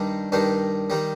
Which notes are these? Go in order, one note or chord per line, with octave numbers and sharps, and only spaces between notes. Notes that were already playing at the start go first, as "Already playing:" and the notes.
Already playing: G2 D#3 G3
G2 D#3 G3
D#3 G3